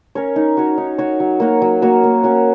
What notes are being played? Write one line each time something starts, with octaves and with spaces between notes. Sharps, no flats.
C#4 A#4 C#5
D#4
F#4 C#5
D#4
F#4 C#5
F#3
A#3 F#4 C#5
F#3
A#3 F#4 C#5
A#3
C#4 F#4 C#5